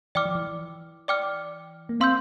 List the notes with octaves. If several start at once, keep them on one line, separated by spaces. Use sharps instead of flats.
E3 D5 G5 D6 F6
F3
E3
D5 G5 D6 F6
A#3
C4 F5 C6 E6 G6